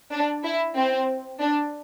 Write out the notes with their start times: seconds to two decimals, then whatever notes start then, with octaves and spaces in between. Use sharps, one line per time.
0.11 D4
0.44 E4
0.76 C4
1.40 D4